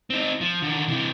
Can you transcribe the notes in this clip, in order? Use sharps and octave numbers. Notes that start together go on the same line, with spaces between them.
C4 D#4
F3
D3 D#3
C3 E3